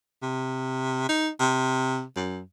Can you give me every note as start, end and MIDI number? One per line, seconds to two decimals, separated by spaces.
0.23 1.08 48
1.09 1.29 63
1.40 2.04 48
2.16 2.40 42